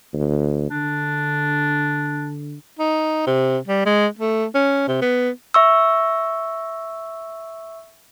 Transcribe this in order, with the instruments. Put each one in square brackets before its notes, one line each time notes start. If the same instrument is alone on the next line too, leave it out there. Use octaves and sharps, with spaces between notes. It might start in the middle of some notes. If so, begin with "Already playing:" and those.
[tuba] D2
[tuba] D3 [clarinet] D4
[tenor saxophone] D#4
C3
G3
G#3
A3
C#4
C3
B3
[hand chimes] E5 C#6 E6